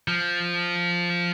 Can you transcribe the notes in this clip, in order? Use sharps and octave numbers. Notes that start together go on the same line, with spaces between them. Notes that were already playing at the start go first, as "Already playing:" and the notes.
F3